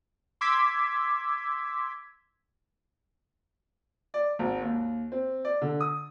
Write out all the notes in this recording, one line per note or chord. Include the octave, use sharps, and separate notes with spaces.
C6 D6 E6 G#6 B6
D5
G#1
D#2
C4
D5
D3
D#6